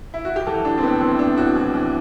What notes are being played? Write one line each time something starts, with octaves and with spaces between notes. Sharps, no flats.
E4
F#4
G4
E3 A4
A2 D4
C4
A2 B3
E3 C4
A2 D4
A2 F#4
E3
E3